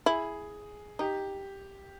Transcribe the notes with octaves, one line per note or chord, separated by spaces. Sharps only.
E4 G#4
D#4 G4